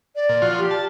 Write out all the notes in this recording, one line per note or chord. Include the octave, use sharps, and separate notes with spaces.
D5
A#2
F3 F4 F#4
G4
A5